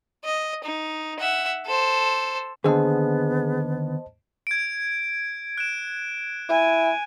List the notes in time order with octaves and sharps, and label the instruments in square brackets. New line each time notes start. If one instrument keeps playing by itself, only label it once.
[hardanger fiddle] D#5
D#4
E5 F#5
A4 C5
[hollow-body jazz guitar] D#2 D3 [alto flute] B3 [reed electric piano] G#4 [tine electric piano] C5 D#5 A5
[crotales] G#6 D7
F#6 D7 E7
[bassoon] E4 [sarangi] G#5